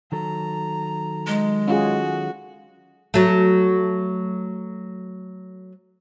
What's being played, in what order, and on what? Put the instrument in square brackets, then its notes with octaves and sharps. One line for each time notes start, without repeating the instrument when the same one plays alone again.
[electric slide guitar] D#3 F#3 A4 [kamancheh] A#5
[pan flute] G#3
[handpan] C#4 F4 G#4 [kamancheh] F#4
[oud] F#3 A3